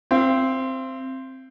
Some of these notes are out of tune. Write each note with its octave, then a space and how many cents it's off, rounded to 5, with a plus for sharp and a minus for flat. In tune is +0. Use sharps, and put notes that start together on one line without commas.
C4 +0 F5 -45